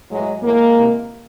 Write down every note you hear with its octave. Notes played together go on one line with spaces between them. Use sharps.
A2 E3 F#3 G#3
A2 E3 G#3 A#3
C3 E3